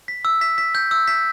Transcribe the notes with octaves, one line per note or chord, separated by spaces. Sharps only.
B6
E6
B6
B6
G6
E6
B6